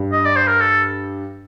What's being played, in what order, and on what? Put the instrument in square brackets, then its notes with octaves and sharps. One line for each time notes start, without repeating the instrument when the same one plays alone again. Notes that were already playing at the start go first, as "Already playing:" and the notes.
Already playing: [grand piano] G2
[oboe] D#5
D5
C5
A#4
A4